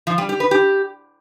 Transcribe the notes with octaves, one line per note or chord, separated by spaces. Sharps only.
F3
G3
G4
B4
G4